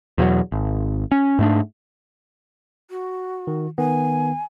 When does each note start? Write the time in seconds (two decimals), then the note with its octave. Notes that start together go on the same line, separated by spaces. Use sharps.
0.18 E2 B2 F3 F#3
0.52 G#1
1.12 C#4
1.39 G#2 A3 D4
2.90 F#4
3.47 D#3
3.78 D#3 B3 G#5